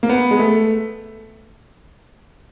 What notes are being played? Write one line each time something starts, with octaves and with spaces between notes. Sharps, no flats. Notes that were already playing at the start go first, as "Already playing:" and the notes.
A#3
B3
G#3
A3